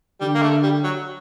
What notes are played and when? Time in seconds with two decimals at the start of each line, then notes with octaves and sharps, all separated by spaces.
0.21 D3 G3
0.35 A#3
0.42 A3
0.63 G3
0.84 F#3